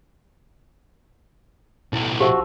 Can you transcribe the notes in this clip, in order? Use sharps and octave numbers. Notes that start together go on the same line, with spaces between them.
B1 A2 E4
F3 F#4 G4 E5